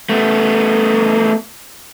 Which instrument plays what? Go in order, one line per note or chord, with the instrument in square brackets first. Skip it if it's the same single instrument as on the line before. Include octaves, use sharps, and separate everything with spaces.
[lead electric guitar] A3 B3